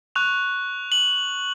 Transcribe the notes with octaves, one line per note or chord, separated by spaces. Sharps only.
C#6 F#6 F7
F#7